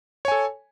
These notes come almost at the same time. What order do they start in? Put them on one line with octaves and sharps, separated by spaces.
C#5 G#5 A4